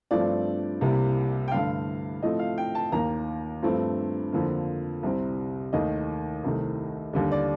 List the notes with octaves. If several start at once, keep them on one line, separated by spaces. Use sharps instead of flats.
G2 F3 A3 C4 D5
C2 C3 G3 A#3
G5
G2 D3 A3 F5
A2 F3 A3 C4 D#5
F5
G5
A5
D#2 D#3 A#3 A#5
G2 F3 A3 C4
F2 D3 F3 A#3
C2 C3 G3 C4
D#2 D#3 A3 D#5
C2 C3 D#3 A3
D#2 D3 G3
D5